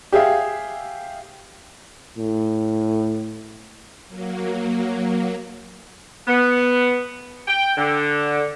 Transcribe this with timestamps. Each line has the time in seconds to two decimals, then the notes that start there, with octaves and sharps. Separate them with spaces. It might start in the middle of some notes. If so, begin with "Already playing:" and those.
0.12 G4 G#4 E5 F5
2.18 A2
4.08 F#3 A#3
6.28 B3
7.48 G5
7.77 D3